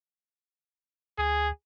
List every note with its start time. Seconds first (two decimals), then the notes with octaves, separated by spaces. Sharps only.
1.18 D2 G#4